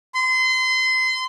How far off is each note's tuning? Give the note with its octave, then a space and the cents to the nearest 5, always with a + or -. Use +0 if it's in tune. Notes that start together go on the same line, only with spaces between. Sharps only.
C6 -30